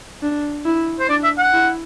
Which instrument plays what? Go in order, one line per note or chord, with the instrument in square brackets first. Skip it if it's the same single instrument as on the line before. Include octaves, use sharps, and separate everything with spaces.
[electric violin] D4
E4
[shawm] C5
[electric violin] D4 [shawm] D5
[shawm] E5
F#5
[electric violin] E4